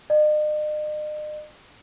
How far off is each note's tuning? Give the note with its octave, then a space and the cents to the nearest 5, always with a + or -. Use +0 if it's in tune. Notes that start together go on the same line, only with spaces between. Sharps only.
D#5 -45